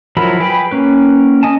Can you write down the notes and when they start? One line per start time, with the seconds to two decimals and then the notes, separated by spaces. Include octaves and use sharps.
0.17 F3 F#3 E4 A#4 B5
0.40 G#4 B4 G5 B5
0.71 A#3 C#4 B4
1.43 C#4 D#5 G#5 A5